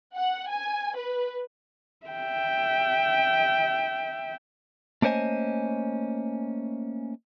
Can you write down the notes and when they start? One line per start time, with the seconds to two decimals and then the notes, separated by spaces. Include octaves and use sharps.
0.15 F#5
0.50 G#5
0.96 B4
2.07 E5 G5
5.02 A3 A#3 C#4 C5 D#5 G#5